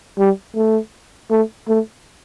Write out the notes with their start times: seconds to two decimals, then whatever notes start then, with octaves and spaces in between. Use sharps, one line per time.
0.19 G3
0.56 A3
1.30 A3
1.68 A3